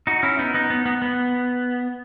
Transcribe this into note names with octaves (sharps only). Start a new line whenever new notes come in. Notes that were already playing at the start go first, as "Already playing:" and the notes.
D#4 F#4
C#4 E4
B3 D#4
B3 D#4
B3
B3
B3